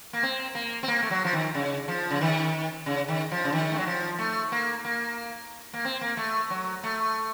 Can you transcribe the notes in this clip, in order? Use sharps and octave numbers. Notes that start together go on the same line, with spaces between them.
A#3
C4
A#3
C4
A#3
A3
F#3
F3
D#3
C#3
F3
C#3
D#3
C#3
D#3
F3
C#3
D#3
A3
F#3
F3
A3
A#3
A#3
A#3
C4
A#3
A3
F#3
A3